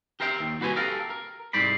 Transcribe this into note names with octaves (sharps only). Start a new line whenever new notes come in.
G4 A#4 C5 E5 G5
D#2
C2 F#4 B4 C5 G#5
G4 A4 A#4 F5
A#4
C2 G#2 C5 D5 B5